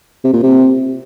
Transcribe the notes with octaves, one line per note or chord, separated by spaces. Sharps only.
C3
A#2
C3